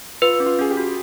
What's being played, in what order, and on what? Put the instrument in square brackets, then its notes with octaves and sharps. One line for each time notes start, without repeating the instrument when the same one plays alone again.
[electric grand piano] F4 [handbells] B4
[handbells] C#4
[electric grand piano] F4
[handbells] C#4 [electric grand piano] G#4
[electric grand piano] G4
[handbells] F#4